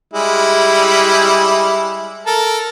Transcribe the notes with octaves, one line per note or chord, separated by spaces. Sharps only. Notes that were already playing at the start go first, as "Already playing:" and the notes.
G3 G#3 E4
A4 A#4